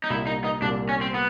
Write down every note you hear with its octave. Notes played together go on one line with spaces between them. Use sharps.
D#4
C2 A#2 G3 A#3 E4
D#4
D#4
C2 A#2 G3 A#3 D4
C#4
C4
B3